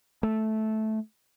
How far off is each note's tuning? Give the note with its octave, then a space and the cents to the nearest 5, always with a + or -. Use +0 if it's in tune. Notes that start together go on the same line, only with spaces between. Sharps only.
A3 -10